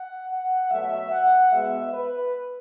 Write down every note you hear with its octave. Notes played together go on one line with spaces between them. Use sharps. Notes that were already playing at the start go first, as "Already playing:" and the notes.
Already playing: F#5
F#5
B2 F#3 A3 E5
F#5
B2 G#3 B3 E5
B4